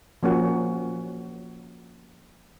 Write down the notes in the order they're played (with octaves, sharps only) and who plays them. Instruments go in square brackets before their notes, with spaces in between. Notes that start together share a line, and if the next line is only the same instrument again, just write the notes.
[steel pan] F3 A#3 C#4 F#4